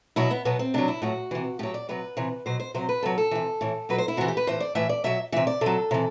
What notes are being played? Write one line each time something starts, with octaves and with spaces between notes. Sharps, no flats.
B2 F#3 E4
B3
B2 F#3 B3
C4
C3 F#3 D4
E4
A2 F#3 F#4
C3 E3
A2 F#3 G4
D5
C3 F#3 B4
C3 E3
B2 F#3 C5
C5
C3 F#3 C5
B4
C3 F#3 A4
A4
C3 E3
A2 E3
B2 F#3 B4
C5
E4
C3 E3 F#4
G4
B4
A2 E3 C5
D5
A2 E3 E5
D5
B2 F#3 E5
C3 E3 E5
D5
C3 F#3 A4
C3 E3